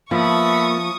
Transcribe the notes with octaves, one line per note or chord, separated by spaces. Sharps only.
F3 A#3 B3 E5 A5 B5 C#6 D#6